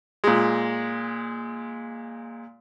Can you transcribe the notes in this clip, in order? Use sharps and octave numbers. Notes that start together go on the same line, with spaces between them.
A#2 G#3